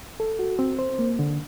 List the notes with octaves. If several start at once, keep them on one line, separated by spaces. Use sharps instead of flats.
A4
F#4
C4
C5
A#3
D3